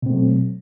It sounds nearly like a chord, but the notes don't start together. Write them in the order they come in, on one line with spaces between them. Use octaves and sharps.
B2 C4 A3 F#3